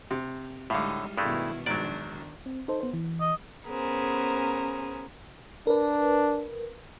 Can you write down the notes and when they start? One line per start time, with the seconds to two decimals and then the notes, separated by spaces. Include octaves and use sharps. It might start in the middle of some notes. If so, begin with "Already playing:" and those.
0.11 C3
0.70 A2 D3 G3 G#3 D#4 E5 F5
1.17 G2 B2 D#3 G#3 A3 E4
1.66 A#1 G#2 D#3 F#3 D4 D5
2.46 C4
2.68 D#4 A4 C5
2.81 B3 C5
2.93 E3
3.20 D#5
3.66 B3 C#4 G#4 A#4 C5
5.67 D4 A#4 B4